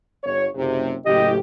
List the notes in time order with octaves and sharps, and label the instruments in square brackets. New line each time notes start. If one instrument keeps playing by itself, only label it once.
[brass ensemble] G1 C#5
F#1 C3
[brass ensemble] F#1 A2 G4 [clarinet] D#5